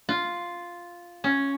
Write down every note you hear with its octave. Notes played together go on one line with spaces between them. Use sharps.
F4
C#4